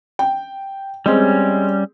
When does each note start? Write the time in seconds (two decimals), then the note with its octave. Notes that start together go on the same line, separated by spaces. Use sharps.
0.19 G5
1.06 G3 G#3 C4 C#4